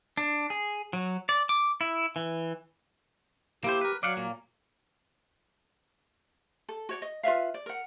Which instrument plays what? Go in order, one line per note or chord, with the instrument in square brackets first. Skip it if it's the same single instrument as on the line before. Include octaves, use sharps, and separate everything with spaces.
[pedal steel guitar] D4
G#4
F#3
D5
D6
E4
E3
[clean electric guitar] A#3 E4 C5 [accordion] G4
[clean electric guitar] A#4 B4
[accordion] F#3 [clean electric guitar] D5 F5 F#5
[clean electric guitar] A#2 A#3
[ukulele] A4
F#4 C#5 D5
D#5
F4 B4 E5 F5
D5
A#4 F#5